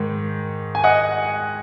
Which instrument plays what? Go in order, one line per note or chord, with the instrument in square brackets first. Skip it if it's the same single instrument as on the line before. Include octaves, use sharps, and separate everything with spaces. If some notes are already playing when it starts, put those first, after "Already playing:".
Already playing: [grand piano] G#2 D#3
G#5
D#5 F#5